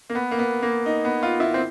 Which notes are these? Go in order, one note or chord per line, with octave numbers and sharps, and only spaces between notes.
A#3
B3
A#3
B3
A#3
D#4
B3
F4
E4
C4